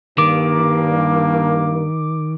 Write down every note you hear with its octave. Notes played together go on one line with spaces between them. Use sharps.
G2 D#3 A#3 D6